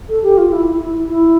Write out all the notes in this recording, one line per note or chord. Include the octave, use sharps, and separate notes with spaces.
A4
G4
F4
E4
E4
E4
E4